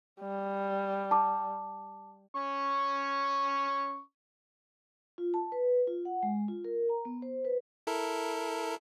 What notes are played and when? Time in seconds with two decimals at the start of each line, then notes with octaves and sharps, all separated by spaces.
0.20 G3
1.11 A5 D6
2.35 C#4 C#6
5.18 F4
5.34 A5
5.52 B4
5.87 F4
6.05 F#5
6.23 G#3
6.48 F4
6.65 A#4
6.89 A#5
7.05 B3
7.22 C5
7.45 B4
7.87 E4 A4 A#4